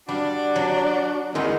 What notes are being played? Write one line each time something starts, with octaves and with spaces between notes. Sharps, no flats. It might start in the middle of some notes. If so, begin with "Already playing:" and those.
G3 D4 F#4 F5
F#3
E2 D#3 G#3